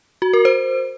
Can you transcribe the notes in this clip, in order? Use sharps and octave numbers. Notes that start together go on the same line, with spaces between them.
F#4
A#4
C5